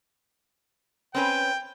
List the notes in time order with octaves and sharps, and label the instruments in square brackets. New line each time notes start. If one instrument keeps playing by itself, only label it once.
[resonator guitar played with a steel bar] C4 C#4 B4 [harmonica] G5